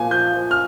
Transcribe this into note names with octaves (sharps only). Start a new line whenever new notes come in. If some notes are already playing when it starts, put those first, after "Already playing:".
Already playing: A#2 F3 G#5
F3 G6
F3
F6